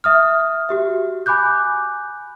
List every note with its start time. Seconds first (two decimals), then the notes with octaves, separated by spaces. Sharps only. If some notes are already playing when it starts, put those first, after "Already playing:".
0.04 E5 D#6 F6
0.69 F#4 G4 E5
1.26 G#5 B5 D6 F#6 G6